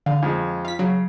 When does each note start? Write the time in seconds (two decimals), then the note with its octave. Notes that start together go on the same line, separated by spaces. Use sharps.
0.06 D3 F5
0.23 F2 G#3
0.65 F4 B6
0.79 C#3 F#3